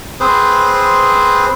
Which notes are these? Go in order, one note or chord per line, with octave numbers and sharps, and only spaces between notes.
C4 G#4 B4 C5